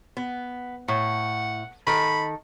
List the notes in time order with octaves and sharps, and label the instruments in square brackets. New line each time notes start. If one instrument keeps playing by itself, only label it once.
[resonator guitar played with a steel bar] B3
[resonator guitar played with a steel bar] A2 [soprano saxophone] F#5
[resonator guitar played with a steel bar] D#3 A4 [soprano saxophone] B5